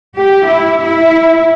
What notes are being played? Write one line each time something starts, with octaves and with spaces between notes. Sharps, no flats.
G4
E4
E4